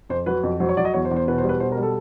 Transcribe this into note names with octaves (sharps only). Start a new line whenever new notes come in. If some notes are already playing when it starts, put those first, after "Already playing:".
F2 C5
F#3 B4
F2
F#3 C5
C#5
F#3 D5
D#5
E2 C#5
C5
E2
C5
B2 B4
C5
G3
B4
B2 C5
A#4
G3
A4